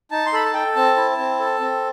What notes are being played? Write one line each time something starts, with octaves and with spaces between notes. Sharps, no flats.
D#4 A5
C6
A4 B5
A5
A4 G5
C4 A5
E4
C4
A4
C4